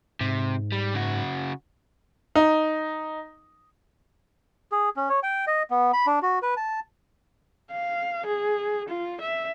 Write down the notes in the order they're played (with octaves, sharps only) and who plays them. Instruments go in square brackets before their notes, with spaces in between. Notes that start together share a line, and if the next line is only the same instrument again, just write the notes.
[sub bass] G#2 [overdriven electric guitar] C3
[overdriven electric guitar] G3
C#3 F#4
[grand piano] D#4
[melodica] G#4
C#4
C#5
G5
D#5
B3
B5
D4
F#4
B4
A5
[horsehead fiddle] F5
G#4
F4
E5